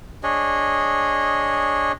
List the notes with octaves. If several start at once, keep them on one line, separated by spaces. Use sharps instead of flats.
D4 G#4 C#5 D#5